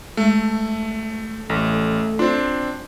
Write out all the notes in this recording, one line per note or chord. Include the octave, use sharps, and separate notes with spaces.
G#3 A3
A1 A3
C4 D4 F4